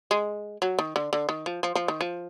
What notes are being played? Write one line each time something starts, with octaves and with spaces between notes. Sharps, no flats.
G#3
F#3
D#3
D3
D3
D#3
F3
F3
F3
D#3
F3